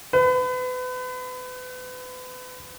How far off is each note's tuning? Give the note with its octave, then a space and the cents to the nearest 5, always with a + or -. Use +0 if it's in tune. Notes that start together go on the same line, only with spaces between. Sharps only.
B4 +35